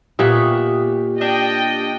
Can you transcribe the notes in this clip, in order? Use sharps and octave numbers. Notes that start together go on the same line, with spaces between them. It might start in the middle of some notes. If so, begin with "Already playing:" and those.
A#2 B3 G4 B4 E5 C#6
D4 D#5 G5